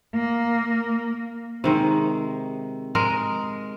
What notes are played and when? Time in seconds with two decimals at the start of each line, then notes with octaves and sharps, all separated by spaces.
0.15 A#3
1.64 C3 D#3 G#3
2.95 G#3 A#4 D#5